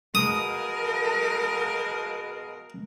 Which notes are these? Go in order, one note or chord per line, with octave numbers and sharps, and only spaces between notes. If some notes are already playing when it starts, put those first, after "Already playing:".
B2 G#3 A#4 F5 D#6